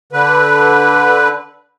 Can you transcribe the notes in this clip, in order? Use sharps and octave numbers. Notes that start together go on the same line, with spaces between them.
D3 B4